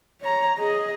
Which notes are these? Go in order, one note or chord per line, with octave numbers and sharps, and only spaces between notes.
C#5 A#5
G#4 D#5